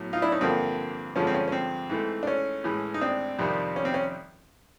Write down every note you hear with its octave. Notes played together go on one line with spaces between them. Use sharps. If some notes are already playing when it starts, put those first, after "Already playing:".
Already playing: A2 F#3 B3
D#4 F4
D4 E4
C#4 D#4
G2 D3 F3 A#3 C4
G2 D3 F3 G#3 C#4
C4
C#4
C#4
C4
G#2 E3 A3
D4
C#4
A2 E3 G#3
D#4
C4 D4
F2 C3 D#3 G3
C#4
C4
C#4